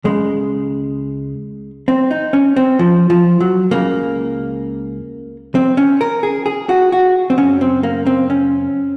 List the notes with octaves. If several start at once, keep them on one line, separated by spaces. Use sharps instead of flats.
C#2 C#3 G#3
C4
D#4
C#4
C4
F3
F3
F#3
C#2 C#3 A#3
C4
C#4
A#4
G#4
G#4
F#4
F#4
C4
F#2 C#3 C#4
C4
A#3
C4
C#4